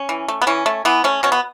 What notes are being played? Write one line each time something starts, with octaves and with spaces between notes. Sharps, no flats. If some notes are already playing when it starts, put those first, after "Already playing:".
Already playing: C#4
E3
A3
B3
E3 C#4
A3
E3 B3
A3 C#4
B2 C#4
B3